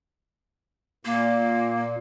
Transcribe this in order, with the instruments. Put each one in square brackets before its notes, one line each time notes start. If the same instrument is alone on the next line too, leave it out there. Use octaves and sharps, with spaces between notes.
[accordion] A#2 [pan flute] A#3